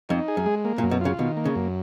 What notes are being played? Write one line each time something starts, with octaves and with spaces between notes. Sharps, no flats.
F2 D#4
G#4
F#2
G#3
A#3
A#2
F#2
B2
C#3 F4
B2 D#3
A#3
C#3
F#2